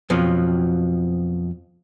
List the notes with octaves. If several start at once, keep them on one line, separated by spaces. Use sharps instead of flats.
F2 B2 F3 F#3